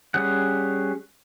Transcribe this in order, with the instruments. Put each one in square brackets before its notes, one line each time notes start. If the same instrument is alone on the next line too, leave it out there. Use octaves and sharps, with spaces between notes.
[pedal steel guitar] G3 C#4 G#4 F#5